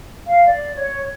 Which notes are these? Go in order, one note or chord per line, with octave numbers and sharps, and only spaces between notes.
F5
D5
C#5